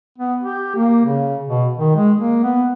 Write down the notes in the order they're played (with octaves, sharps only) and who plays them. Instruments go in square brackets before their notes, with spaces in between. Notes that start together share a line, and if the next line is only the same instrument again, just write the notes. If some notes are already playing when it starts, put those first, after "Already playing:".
[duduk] B3
G4
A#3
C#3
B2
D#3
G#3
A#3
B3